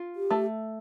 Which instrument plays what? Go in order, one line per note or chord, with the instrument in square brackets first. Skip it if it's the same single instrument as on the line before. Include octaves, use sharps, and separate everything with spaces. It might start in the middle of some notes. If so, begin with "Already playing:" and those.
Already playing: [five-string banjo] F4
[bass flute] G4
[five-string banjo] A3